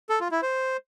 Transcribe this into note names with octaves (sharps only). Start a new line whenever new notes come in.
A4
F4
E4
C5